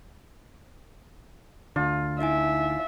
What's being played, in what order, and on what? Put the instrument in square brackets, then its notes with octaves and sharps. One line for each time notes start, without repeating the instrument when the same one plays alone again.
[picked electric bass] D2 D3 [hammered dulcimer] F4
[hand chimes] D#4 E4 G#5 [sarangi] E5